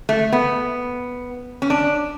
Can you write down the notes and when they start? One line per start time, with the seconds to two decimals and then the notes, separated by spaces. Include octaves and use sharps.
0.09 A3
0.33 B3
1.62 C#4
1.70 D4